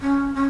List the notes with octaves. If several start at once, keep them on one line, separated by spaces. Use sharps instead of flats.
C#4
C#4